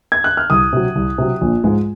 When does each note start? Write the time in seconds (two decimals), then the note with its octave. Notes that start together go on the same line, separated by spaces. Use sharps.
0.12 G#6
0.24 F#6
0.37 F6
0.50 C2 D#6
0.73 C3 F#3
0.95 C2
1.18 C3 F#3
1.41 A#1
1.64 G#2 F3 G#3